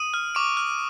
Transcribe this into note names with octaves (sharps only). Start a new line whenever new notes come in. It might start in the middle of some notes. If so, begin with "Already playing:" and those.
Already playing: D#6 D#7
F6
C#6 D6 D7
F6